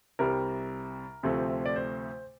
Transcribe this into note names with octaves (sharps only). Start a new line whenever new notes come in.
C2 C3 G3 A#4
D2 C3 F3 A3 C4
D5
C5